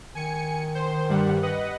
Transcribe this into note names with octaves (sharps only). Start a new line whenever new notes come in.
D#3 G#5 C#7
C5
G2 G3 F#5
B4 D#5 F#5